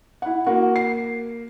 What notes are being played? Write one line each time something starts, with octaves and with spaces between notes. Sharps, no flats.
E4 F#5
A#3 F#4
C7